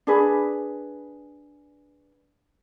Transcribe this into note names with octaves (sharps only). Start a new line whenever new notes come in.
D4 G#4 B4